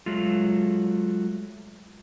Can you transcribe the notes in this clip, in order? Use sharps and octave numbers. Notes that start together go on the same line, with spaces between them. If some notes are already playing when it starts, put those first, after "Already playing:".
F#3 G#3 A3 F4